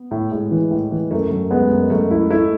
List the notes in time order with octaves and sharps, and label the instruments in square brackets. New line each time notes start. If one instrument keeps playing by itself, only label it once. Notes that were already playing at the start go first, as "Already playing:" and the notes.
Already playing: [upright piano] B3
[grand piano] A2
[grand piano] A2 [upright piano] G#3
[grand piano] E3
A2
E3
[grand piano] F#2 [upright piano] A3
[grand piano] F#2
[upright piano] G#3 [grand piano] B3
[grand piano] F#2
[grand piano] F#2 [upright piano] A3
[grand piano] E4
[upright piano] A3 [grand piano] E4